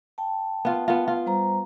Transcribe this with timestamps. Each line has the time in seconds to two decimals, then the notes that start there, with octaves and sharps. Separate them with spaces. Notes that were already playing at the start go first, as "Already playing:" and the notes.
0.18 G5 A5
0.65 B3 F4
0.88 B3 F4
1.08 F4
1.26 G3 C5 A#5